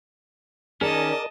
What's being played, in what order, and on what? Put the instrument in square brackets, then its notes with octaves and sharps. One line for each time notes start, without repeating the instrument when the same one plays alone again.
[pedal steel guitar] D#3 C#4 [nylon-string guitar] G#4 [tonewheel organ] A#4 D5 [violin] D#5 A5